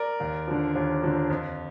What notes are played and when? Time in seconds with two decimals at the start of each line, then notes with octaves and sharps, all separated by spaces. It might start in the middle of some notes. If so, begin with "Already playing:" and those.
Already playing: A#4 D5
0.20 D#2
0.47 D3 F3
0.75 D#2
1.03 D3 F3
1.30 F2